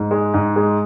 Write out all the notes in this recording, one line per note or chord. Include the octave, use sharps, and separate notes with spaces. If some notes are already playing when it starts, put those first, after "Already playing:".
Already playing: G#2
G#3
G#2
G#3